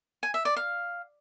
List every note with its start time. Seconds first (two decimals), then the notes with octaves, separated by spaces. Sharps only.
0.23 G#5
0.34 E5
0.45 D5
0.56 F5